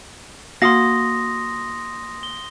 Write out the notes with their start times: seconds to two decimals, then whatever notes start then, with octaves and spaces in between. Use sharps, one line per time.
0.62 A#3 F#4 F5 C6 D#6 A#6
2.23 G7